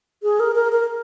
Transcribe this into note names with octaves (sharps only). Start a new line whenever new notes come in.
G#4
A#4
A#4
A#4